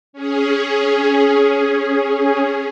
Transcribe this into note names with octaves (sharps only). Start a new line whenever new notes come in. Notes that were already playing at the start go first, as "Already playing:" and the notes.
C#4 G#4